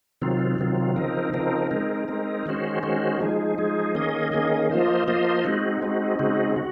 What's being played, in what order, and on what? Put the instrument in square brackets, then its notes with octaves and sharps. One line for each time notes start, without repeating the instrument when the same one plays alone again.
[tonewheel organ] C3 D#3 F#3 C4 F4
C3 D#3 F#3 C4 F4
C#3 F3 C4 D#4 A#4
C#3 F3 C4 D#4 A#4
G#3 C4 D#4 A#4
G#3 C4 D#4 A#4
D#3 G#3 C#4 F#4 C5
D#3 G#3 C#4 F#4 C5
F3 G#3 D#4 G#4
F3 G#3 D#4 G#4
D#3 A#3 C#4 G#4 D#5
D#3 A#3 C#4 G#4 D#5
F3 A#3 F4 C5 D#5
F3 A#3 F4 C5 D#5
G#3 C4 D#4 F#4
G#3 C4 D#4 F#4
C#3 G#3 C4 D#4 F#4
F#4